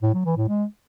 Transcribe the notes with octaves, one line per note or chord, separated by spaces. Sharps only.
A2
F#3
E3
A2
G#3